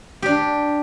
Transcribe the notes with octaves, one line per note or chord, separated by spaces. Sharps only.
D4 G4